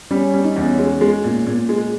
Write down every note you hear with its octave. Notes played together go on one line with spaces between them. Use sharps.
G3 C#4
G3
D#4
E2 C#4
G#3
G#3
A#2
A#2
G#3